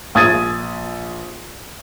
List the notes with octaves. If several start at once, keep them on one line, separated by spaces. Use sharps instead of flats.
A#1 D#6 G#6 A6 D#7